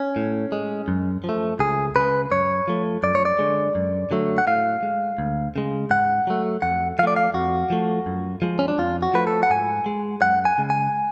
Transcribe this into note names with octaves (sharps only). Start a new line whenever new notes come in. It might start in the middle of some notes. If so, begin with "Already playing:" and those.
Already playing: C#4
A2
G#3
F#2
F3 A3
C#2 G#4
C#3 G#3 B4
F#2 C#5
F3 A3
F#2 D5
C#5
D5
D3 G#3
F#2
D3 F#3 A3
F#5
A2 F5
G#3
D2
C#3 G#3
G#2 F#5
F#3 A3
F2 F#5
F3 A3 D5 F5
F5
F2 F#4
F3 A3
F#2
F3 G#3
C#4
D4
F2 F4
F#4
F3 A3 B4
A4
F#5
G#2 G#5
G#3
F#2 F#5
G#5
C#3 G#3
G#5